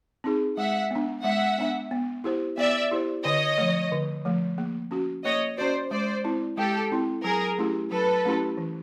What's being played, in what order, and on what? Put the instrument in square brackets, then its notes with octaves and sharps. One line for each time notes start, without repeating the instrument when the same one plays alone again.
[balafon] C4 D#4 G#4
[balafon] G#3 [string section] E5 F#5
[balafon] B3 D4
[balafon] G#3 [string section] E5 F#5
[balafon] B3 D4
B3
E4 G4 C5
[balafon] B3 [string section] D5 E5
[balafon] E4 G4 C5
[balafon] D3 [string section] C#5 D#5
[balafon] F3 A3
D3
F3 A3
A#3
C#4 F#4
[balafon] A#3 [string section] C#5 D#5
[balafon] C#4 F#4 [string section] C5 D5
[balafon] G#3 [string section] C5 D5
[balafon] C4 E4
[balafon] G#3 [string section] G4 A4
[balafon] C4 E4
[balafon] F#3 [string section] G#4 A#4
[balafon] A3 C#4 E4 G4
[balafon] F#3 [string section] A4 B4
[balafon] A3 C#4 E4 G4
E3